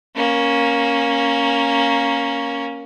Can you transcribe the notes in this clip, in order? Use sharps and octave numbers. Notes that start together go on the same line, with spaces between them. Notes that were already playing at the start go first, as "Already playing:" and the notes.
A#3 C#4